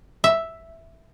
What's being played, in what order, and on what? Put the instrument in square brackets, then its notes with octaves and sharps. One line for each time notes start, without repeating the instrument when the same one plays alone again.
[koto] E5